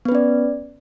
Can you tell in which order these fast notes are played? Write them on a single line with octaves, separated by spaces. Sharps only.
B3 B4 C#4 D5